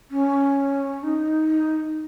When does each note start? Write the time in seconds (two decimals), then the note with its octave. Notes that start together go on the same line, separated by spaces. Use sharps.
0.11 C#4
1.03 D#4